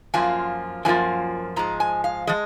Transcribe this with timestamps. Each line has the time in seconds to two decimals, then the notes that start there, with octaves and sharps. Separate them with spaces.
0.14 F#2 F3 A#3 F4 G#5
0.85 F#2 F3 A#3 F4 G#5
1.56 G#2 F3 G#3 A#5
1.80 G#5
2.04 F5
2.27 F3 G#3 D#5